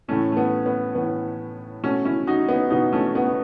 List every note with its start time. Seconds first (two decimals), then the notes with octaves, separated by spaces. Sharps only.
0.08 A2 E3 A3 C#4
0.32 A3
0.37 B3
0.66 B3
0.95 A2 E3 B3
1.83 B2 A3 C#4
2.05 C#4 E4
2.27 D#4 F#4
2.49 B3 D#4
2.70 B2 B3 D#4
2.93 A3 C#4
3.06 C#4
3.15 B3
3.27 B3